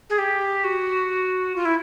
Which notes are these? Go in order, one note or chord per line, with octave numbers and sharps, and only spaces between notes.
G#4
G4
F#4
F4
E4